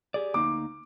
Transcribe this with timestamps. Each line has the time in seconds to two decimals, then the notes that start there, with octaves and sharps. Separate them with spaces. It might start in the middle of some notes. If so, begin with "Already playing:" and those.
0.14 G4 G#4 D5
0.34 D2 A#3 D#4 D6